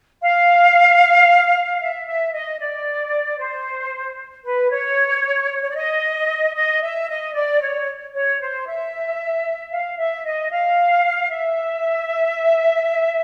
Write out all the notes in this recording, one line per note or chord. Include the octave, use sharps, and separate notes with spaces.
F5
E5
E5
D#5
D5
C5
B4
C#5
C#5
D5
D#5
D#5
E5
D#5
D5
C#5
C#5
C5
E5
F5
E5
D#5
F5
E5